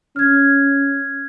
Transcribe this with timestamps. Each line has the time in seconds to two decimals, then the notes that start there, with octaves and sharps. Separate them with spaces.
0.16 C#4 F6 G#6